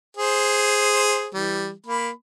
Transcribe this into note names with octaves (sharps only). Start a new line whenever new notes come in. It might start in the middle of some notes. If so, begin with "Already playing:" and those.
G#4 C5
E3 G3
A#3 B5